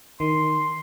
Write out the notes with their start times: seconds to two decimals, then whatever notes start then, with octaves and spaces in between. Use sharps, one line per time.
0.20 D#3 C6